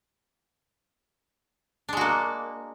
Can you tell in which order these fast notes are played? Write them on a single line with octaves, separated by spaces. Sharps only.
D4 G#3 F#4 A#3